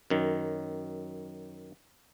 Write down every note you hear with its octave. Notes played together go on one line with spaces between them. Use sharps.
F#2 D#3